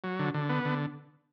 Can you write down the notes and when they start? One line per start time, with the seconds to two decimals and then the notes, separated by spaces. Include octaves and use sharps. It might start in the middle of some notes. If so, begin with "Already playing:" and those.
0.04 F#3
0.19 D3
0.34 D3
0.49 B3
0.65 D3